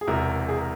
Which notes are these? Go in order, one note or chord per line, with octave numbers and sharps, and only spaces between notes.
G#4
E1 E2 C3 A#4
G#4
A#4